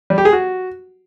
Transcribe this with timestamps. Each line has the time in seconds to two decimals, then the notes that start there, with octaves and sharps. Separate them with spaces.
0.10 G3
0.18 G4
0.25 G#4
0.33 F#4